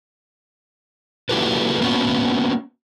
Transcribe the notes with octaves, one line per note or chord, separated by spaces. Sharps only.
A#3 E4 F#4 G4 A4 B4
A#3 B3 C#4 F#4